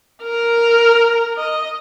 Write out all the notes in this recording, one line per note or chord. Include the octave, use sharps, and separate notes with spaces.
A#4
D#5